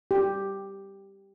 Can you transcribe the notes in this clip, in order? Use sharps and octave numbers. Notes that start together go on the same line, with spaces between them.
G4